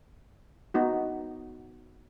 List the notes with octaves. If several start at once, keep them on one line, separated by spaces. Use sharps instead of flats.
B3 D#4 F#4